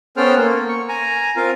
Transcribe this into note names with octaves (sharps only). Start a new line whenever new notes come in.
B3 C#4 A4 C5 G5 F6
A#3
C#6
G#5 A#5
C4 F4 A#4 F5